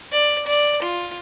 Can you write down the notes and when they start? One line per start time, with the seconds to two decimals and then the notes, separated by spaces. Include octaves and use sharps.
0.12 D5
0.47 D5
0.82 F4